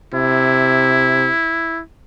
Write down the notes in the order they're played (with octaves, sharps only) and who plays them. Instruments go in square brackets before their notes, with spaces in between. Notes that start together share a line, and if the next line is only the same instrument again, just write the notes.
[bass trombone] C3 [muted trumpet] E4